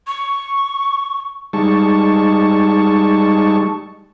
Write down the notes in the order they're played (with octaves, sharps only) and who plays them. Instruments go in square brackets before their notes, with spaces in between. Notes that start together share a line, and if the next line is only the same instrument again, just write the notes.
[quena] C#6
[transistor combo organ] G3 G#3 D#4 A5 C#6